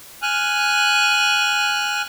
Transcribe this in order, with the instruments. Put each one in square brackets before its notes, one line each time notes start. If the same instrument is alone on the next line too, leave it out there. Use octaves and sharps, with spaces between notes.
[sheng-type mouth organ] G#5 F6 F#6